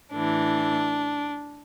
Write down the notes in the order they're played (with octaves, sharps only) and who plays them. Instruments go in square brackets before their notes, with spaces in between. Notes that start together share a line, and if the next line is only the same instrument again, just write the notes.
[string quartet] A2 E3 D4